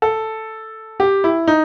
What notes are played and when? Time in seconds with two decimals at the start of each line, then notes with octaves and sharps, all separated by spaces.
0.02 A4
1.00 G4
1.24 E4
1.48 D#4